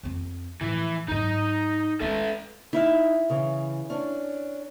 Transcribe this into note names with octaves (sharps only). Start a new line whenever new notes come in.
F2 C4
A2 E3 F3
G#2 F#3 D#4 D#5
G#3 C#4 A4 B4 E5
D#4 E4 E5 F5
C#3 E3
C#4 D4